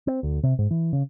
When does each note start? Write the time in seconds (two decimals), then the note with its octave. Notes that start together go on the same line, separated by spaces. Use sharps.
0.07 C4
0.23 D2
0.43 C3
0.59 G#2
0.71 E3
0.93 C#3